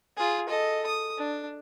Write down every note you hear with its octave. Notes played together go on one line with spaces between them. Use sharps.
F4 G#4
A4 D#5
D#6
D4